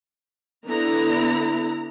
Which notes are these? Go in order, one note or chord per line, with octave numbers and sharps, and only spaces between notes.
D3 B3 E4 A#5